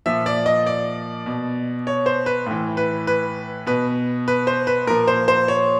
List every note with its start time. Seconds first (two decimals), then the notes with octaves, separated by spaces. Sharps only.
0.06 A#2 F3 E5
0.26 D5
0.46 D#5
0.66 D5
1.26 B2
1.87 C#5
2.06 C5
2.26 B4
2.46 A2 E3
2.77 B4
3.07 B4
3.67 B2 B4
4.28 B4
4.47 C5
4.67 B4
4.87 A#2 F3 A#4
5.08 C5
5.28 C5
5.48 C#5